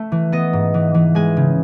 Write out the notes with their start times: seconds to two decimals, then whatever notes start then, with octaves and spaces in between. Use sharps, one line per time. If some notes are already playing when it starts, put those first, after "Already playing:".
Already playing: A3 E5
0.12 E3
0.32 B3 D#5
0.53 G#2
0.74 E3
0.94 E3
1.15 G#3 G#5
1.37 C#3